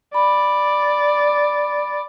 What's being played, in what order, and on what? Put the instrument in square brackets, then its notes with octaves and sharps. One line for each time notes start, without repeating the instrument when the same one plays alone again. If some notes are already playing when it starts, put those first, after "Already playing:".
[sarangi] D5 [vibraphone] B5